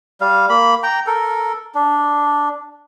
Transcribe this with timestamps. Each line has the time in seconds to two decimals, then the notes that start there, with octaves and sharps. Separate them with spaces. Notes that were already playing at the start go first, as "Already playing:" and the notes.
0.21 G3 F5
0.49 A#3 B5
0.83 G5 A#5
1.07 A4 A#4
1.75 D4